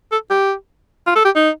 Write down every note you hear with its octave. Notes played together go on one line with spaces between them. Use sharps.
A4
G4
F4
A4
G4
D#4